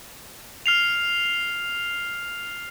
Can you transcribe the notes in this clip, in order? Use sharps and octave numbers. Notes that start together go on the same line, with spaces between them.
F6 C7 F7